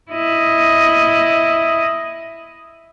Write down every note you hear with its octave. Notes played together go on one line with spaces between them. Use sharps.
E4 D#5